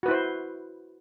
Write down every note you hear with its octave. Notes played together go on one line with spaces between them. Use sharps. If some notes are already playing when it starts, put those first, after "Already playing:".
E4 F#4 B4 C5